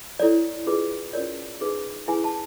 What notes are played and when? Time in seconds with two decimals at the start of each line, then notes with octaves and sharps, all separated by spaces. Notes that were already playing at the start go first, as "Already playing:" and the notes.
0.20 E4 A4 C#5 D5
0.66 D4 F4 G#4 B4
1.13 C#4 F4 A#4 C#5 D5
1.61 D#4 G#4 B4
2.08 E4 G#4 B4 G#5
2.24 A5